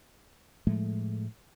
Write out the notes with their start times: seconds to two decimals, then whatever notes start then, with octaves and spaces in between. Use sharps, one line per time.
0.67 A2 F3 G#3 A3